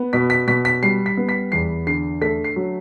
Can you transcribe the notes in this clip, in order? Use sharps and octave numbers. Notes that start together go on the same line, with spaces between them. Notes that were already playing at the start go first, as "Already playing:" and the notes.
Already playing: B3
B2 B6
B6
B2 B6
B6
G3 C7
B6
B3
B6
E2 C7
D3 C7
A3 B6
C7
F#3